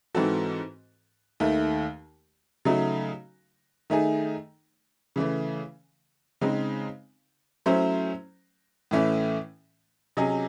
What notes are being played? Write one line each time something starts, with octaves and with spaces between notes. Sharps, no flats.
G#2 E3 C4 F#4 A4
D#2 D#3 A3
C#3 F#3 A3 D#4 F#4
D#3 A3 D#4 G#4
C#3 E3 A3
C#3 G#3 C4 D#4
F#3 A3 C#4 E4 C5
A2 E3 A3 C#4 E4
C3 F#3 C#4 G#4 D#5